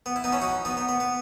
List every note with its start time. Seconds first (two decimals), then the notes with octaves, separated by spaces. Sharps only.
0.06 B3
0.16 E4
0.24 B3 D#4
0.32 C#4 E4
0.42 D#4 F#4
0.65 B3 D#4
0.77 B3
0.89 B3
1.00 B3